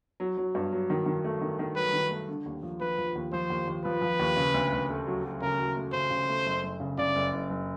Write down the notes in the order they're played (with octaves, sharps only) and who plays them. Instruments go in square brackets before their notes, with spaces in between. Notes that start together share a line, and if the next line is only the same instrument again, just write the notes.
[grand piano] F#3
F#3
G2
F#3
D#3
D#3
A3
D#3
D#3
[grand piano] F#3 [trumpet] B4
[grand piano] D#3
A3
D3
D#2
F3
[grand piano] F3 [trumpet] B4
[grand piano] F3
D#2
[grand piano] F3 [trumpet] C5
[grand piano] D#2
D#2
[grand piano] F3 [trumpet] B4
[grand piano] F3
D#2
C#3
D2
D2
A3
F#3
F#3
[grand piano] C#3 [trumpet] A#4
[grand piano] F#3
A3
[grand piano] C#3 [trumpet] C5
[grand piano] C#3
A3
F#1
F#1
C#3
[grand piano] C#3 [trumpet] D5
[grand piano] F#1
F#1
F#1